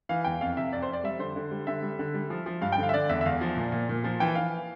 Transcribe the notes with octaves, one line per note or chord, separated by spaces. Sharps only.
E3 F5
E2 G5
F2 F5
C3 E5
F2 D5
C5
F2 D5
G3 E5
D3 C5
D3
G3
D3 E5
G3
D3
G3
F3
F3
G2 F5
G5
D3 F5
E5
D3 D5
E2 E5
E5
E2 F5
F3
A#2
A#2
A#2
F3
E3 G5
E3 F5